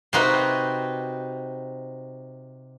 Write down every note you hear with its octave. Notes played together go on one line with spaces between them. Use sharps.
C3 C4 D#4 F#4 B4